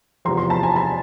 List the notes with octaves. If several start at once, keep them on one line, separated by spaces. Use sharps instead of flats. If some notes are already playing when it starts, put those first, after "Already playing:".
E2 C3 F3 A#5 C6
A#5 C6
A5 B5
G#5 A#5
A5 B5